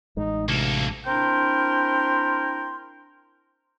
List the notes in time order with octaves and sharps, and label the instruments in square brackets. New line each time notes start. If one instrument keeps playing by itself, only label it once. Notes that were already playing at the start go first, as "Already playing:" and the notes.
[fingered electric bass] A1 G#3 [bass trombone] D#4
[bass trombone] D2 [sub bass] C3 [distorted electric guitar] A#3 A4
[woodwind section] C4 D4 E4 A#4 G5 C6